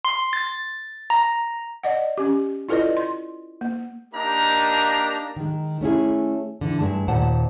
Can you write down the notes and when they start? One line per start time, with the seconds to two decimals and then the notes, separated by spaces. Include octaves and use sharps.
0.05 C6
0.33 A6
1.10 A#5
1.84 D5 D#5 F#5
2.18 C#4 G4
2.69 E4 F4 A4 B4 D5 D#5
2.97 C6
3.61 A#3
4.14 A#3 D4 D#4 G4 A#4 A#5
5.37 D#3 G#3
5.81 A3 C#4 E4 G#4
6.61 D3 E3
6.79 G2 G#3 A3 A5
7.08 D#2 A#2 C5 F#5 A5